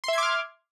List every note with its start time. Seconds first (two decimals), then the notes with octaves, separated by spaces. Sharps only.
0.04 C6
0.08 E5
0.13 G#6
0.18 D6
0.23 F6